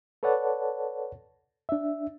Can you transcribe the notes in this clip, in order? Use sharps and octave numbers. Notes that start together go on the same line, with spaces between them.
A4 B4 C#5 D5 F#5 A5
D4 E5